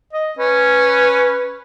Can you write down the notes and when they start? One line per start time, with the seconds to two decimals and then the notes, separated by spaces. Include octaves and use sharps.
0.13 D#5
0.38 C#4 B4